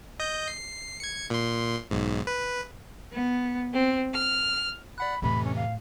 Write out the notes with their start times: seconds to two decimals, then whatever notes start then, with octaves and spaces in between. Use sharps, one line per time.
0.20 D#5 G6
0.48 C7
1.00 G#6 C#7
1.30 A#2 C6
1.91 B1 G#2
2.27 B4
3.12 B3
3.75 C4
4.13 F6
4.98 D5 F#5 B5 F#6
5.22 F2 A2 C3 E3 B5
5.44 C#4
5.55 F5